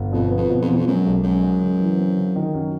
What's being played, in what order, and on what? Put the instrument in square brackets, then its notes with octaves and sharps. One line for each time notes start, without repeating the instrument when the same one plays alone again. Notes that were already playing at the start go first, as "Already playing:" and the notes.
Already playing: [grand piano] G1
[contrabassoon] F2 [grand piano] B2
[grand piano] B3
[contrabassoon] F2
[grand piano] B2
[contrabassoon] F2
[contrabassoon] E2 [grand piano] B2
[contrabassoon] F2
[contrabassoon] F#2 [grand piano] G#3
[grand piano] B1
[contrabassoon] F#2 [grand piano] G#3
[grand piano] G#3
C#3
E3
C4
C#3
D#3
F#2